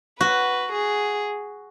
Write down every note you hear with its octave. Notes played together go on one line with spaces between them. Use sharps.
F#4 B4
G#4